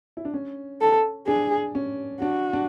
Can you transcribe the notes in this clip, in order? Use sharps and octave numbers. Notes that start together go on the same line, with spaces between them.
E4
D4
C#4
A4
D4 G#4
C#4
D4 F#4
D4